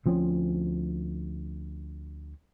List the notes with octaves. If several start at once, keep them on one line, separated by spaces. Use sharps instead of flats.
D2 F3 C4 C#4